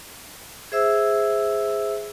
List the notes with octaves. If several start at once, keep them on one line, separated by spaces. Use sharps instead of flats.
G#4 C5 E5 E6